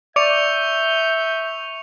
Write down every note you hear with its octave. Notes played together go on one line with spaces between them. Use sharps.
D5 E5 C#6 G6 C#7 F7